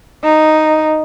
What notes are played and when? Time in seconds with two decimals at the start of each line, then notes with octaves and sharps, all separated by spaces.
0.24 D#4